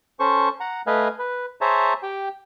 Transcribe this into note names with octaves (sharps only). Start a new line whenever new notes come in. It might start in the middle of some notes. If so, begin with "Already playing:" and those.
C#4 A4 C5 C#6
F#5 A#5
A3 B4 D#5 F5 G#5
B4
G#4 C5 C#5 E5 A5 A#5
G4 G5